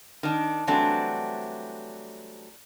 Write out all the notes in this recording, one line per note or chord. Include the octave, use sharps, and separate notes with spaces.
D#3 D4
E3 F#3 G3 A3 C4 D4